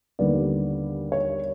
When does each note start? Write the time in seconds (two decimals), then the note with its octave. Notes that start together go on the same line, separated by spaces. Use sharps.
0.19 D#2 D3 G3 B3 D5
1.12 C#5